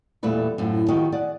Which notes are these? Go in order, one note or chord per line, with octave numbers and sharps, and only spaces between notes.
E2 A#2 G3 A3 B4 D5
F#2 A2 F3
D#3 F3 D#4 F#4 G4
G#4 D5 F#5